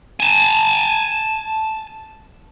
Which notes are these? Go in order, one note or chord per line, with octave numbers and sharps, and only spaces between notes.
G#5 A5